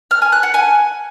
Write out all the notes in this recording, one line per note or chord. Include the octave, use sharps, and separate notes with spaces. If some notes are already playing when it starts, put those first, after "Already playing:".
F6
G#5
F#6
F#5
G#5